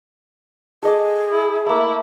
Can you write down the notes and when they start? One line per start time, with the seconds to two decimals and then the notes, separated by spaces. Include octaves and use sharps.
0.83 G#4 A4 D#5 D6
1.32 E4
1.66 A3 A#3 E4